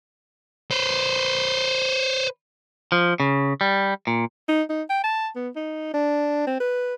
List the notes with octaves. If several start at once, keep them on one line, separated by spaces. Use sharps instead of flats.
B4 C5
F3
C#3
G3
A#2
D#4
D#4
G5
A5
B3
D#4
D4
C4
B4